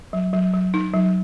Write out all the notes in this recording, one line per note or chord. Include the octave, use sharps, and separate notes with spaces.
F#3
F#3
F#3
D#4
F#3